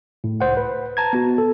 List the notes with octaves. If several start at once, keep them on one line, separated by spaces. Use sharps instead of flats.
A2
C#2 C5 F#5
B4
A5 A#5 G#6
B3 F#4
A4